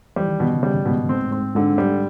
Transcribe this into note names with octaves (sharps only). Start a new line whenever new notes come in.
E3 G3
D#3
B2 D#3
C#3
C#3 G3
G2
G#2 B2
A2
G#2 C4
A2
G#2 C4
G#2 D3
G3